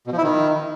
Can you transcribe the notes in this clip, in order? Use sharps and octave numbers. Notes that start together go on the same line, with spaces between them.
B2
F3
E4
D#3